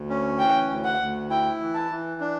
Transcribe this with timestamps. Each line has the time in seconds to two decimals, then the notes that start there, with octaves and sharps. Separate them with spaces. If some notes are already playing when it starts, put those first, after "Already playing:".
Already playing: D2
0.09 C#4
0.39 E3 G5
0.70 D2
0.85 F#5
1.00 D2
1.30 E4 G5
1.61 E3
1.75 A5
1.91 E3
2.21 D4